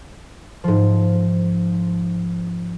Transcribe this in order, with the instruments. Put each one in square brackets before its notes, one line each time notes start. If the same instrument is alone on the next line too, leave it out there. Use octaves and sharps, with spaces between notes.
[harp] G#2 F3